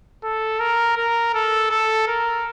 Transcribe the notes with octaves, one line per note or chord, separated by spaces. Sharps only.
A4
A#4
A#4
A4
A4
A#4